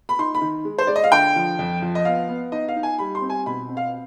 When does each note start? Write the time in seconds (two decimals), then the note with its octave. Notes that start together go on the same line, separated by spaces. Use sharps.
0.09 B5
0.19 D#4 C6
0.35 B5
0.41 D#3
0.65 G#3
0.78 C5
0.87 G#3 D5
0.96 D#5
1.04 F5
1.12 D3 G5
1.36 F3
1.59 F2
1.82 F3
1.95 D#5
2.05 B3 F5
2.29 B3
2.52 D#4 D#5
2.68 F5
2.76 D#4
2.83 G#5
2.98 G3 B5
3.15 C6
3.22 C4
3.30 G#5
3.46 B2 B5
3.69 C4
3.77 F5